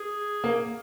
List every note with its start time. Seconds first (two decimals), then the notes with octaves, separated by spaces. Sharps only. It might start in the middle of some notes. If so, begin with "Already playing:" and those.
Already playing: G#4
0.44 A#3